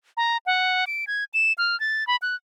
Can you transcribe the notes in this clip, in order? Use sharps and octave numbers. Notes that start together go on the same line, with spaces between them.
A#5
F#5
D7
G#6
E7
F6
A6
B5
F#6